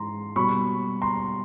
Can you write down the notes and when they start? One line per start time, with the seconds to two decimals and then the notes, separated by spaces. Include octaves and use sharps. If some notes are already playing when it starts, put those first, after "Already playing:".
Already playing: G#2 E3 G#3 A#5 C6
0.36 B2 G3 A#3 B5 C#6
1.02 A#5 C6